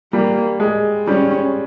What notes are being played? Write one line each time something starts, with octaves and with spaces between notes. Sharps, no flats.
G3 A#3
G#3
G3 C#4